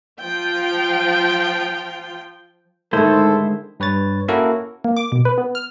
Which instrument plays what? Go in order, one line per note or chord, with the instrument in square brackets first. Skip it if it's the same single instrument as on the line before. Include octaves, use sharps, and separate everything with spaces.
[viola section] F3 F4 G5
[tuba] G#2 [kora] D3 D#3 A3 [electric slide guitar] G#3 E4 C5 [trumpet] A4
[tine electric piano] G2 B4 C#5 A6
A#3 C#4 E4 F#4 A4 A#4
[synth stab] A#3
D6
B2
B4
B3
F6